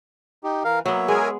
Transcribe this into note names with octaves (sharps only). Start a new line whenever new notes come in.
D#4 G4
E3 A#4 F5
F#3 A#3 B3 C#5 E5
G#3 G#4 A#4 G#5